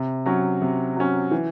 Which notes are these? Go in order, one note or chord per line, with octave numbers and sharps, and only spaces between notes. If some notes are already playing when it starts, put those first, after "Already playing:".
Already playing: C3
F#3 C#4
C3
F#3 C#4
E3